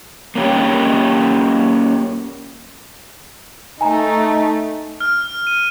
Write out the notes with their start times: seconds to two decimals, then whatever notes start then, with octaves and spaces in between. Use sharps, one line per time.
0.35 A#3 C#4 G4
3.81 A3 D#4 G#5 A#5
5.01 F6
5.47 D#7